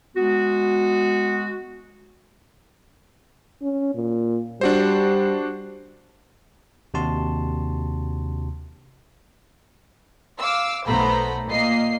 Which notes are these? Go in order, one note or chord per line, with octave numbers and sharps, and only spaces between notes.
G#3 B3 F#4
C#4
A#2
G3 D4 F#4 C5
D#2 C3 D4 F#4 A5 C6
F5 D6 E6
B1 A3 B3 C5 A#5 B5
A#2 A#3 D#5 C7